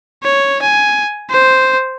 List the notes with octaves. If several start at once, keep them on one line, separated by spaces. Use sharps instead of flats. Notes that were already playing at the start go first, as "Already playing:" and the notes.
C#5
G#5
C5